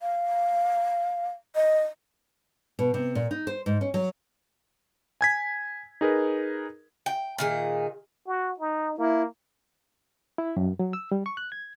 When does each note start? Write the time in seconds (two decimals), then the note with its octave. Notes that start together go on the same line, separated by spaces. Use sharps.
0.01 F5
1.55 D#5
2.79 B2
2.94 C3
3.15 A#2
3.31 D#4
3.47 C5
3.66 G#2
3.81 C#4
3.94 F#3
5.21 G#5 G#6 B6
6.01 D#4 G#4 A#4 B4
7.06 G5
7.38 A#2 D#3 G#4
8.27 F#4
8.60 D#4
8.98 A#3 E4
10.38 E4
10.57 F#2
10.79 F#3
10.93 E6
11.12 G3
11.26 C#6
11.37 F#6
11.52 G#6